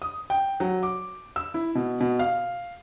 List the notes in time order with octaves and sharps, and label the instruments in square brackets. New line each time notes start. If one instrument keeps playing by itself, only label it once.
[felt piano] D#6
G5
F#3
D6
E6
E4
B2
B2
F5